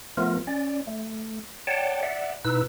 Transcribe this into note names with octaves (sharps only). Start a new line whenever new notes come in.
F3 A3 B3 F4 A#4
C#4 D5
A3
C#5 D5 F#5 G5 A5
D5 E5 F#5
B2 D#4 E4 B4 E6